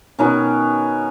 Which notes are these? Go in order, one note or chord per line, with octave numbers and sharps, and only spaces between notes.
B2 D#3 C#4